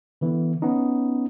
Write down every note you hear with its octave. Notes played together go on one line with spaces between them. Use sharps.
D3 E3 B3
B3 C#4 D#4